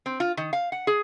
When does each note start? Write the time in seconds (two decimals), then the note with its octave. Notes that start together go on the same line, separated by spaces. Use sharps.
0.06 C4
0.20 F4
0.37 D#3
0.53 F5
0.72 F#5
0.87 G#4